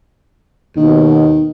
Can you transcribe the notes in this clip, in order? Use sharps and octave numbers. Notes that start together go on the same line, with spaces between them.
D#2 B2 D#3